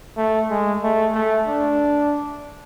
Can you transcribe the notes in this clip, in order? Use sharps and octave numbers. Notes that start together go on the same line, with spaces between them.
A3
G#3
A3
A3
D4